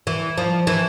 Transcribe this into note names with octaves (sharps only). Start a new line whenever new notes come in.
E3
F3
E3